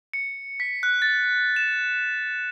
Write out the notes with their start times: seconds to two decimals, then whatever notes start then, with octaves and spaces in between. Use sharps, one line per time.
0.13 C#7
0.60 B6
0.83 F#6
1.02 A6
1.56 E7